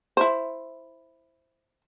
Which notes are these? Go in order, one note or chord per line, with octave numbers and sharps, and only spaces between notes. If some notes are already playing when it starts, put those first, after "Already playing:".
E4 C5